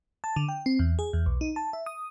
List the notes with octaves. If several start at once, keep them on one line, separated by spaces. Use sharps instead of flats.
A5
D3
G5
C4
E2
G#4
E2
B1
D#4
A5
E5
D#6